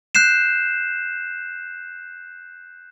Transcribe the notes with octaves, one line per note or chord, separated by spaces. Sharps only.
F#6 G6 C7 E7